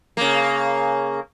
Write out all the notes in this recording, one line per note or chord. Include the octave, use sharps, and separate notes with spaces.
C#3 A#3